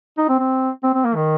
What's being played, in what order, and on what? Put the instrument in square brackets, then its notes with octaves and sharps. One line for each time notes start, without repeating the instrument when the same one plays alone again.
[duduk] D#4
C4
C4
C4
C4
A#3
D#3